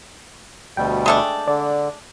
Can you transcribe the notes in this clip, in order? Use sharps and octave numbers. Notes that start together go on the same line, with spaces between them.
D2 B2 G3 G5
G#3 A3 D4
D3 D5